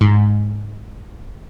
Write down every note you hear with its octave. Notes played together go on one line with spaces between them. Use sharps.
G#2